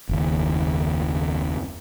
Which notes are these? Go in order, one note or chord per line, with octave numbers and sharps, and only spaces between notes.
F#1 D#2